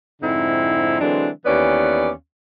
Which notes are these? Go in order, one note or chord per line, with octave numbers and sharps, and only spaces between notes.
F2 G#2 D3 C4 D#4 E4
D3 E3 F#3 G#3 C4 D4
D#2 E3 B3 C#4 D5